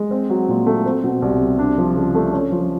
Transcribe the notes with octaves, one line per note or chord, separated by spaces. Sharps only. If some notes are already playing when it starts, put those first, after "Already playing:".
Already playing: G#3
C4
F#3
A#2
A3
C4
B2
C2
G3
D4
F3
C#3
A3
C#4
F3